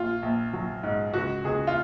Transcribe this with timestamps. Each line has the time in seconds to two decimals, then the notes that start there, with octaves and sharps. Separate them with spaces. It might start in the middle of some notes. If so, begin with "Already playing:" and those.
Already playing: A#1 F4
0.23 A#1
0.53 F#3
0.83 G#2
1.14 C#2 F#4
1.44 C#2 G#4
1.67 F4